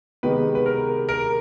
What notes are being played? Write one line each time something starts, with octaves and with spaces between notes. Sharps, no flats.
C3 D#3 G#3 B3 D#4 B4
B4
A#4
A#4